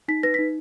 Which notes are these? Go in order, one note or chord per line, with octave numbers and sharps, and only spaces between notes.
D#4 B6
B4 A#6
B6
D#4